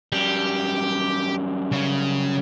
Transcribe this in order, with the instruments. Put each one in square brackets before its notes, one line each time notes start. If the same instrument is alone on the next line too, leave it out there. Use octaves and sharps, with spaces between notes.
[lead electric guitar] F#2 G3 [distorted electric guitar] G4
[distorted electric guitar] C#3